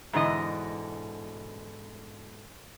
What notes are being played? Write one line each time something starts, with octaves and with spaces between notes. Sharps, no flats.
G#2 B2 D3 E3 D#5